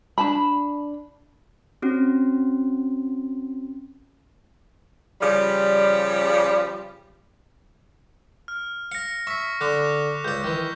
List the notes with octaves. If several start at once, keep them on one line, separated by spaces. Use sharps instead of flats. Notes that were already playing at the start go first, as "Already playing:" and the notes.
D4 A5 B5
C4 C#4 F#4
C#3 F3 G3
F6
F5 A#6 C#7
E5 C#6 B6
D3 D6 F#6
C#2 D5 G6
D#3 E3